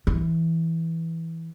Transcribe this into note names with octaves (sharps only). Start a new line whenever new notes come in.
E3